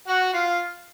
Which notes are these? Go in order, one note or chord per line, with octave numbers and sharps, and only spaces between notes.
F#4 F#5
F4 F5